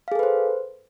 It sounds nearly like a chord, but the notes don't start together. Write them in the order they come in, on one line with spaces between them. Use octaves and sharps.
F5 G#4 A4 B4 C5